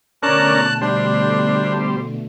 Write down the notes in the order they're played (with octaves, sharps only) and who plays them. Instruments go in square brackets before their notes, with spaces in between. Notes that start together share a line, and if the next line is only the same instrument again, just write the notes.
[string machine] B2 D3 A3 [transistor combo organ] C#4 D4 A#4 [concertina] A5 F#6
[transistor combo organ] G3 C5 [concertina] D4